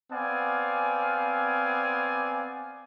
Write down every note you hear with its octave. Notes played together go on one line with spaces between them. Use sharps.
B3 C4 D5 F5 G#5